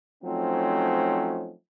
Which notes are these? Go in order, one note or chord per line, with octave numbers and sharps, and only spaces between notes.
F3 F#3 A3 C4 C#4 D#4